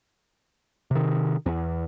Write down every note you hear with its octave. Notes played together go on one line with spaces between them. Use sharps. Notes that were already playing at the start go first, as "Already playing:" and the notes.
C3 D#3
E2